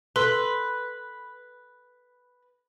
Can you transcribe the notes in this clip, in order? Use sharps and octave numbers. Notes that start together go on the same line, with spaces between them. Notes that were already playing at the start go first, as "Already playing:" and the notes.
A4 B4 C6